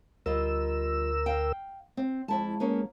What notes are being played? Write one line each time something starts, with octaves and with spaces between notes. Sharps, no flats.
D2 G3 F4 A#4 D#5 E6
F5 G5
C4
F2 G#3 E4 A5
A#3 B3 C#4